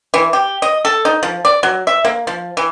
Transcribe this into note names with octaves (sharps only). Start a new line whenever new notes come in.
E3
G4
D#5
A4
D#4
F3
D5
F#3
E5
A#3
F3
E3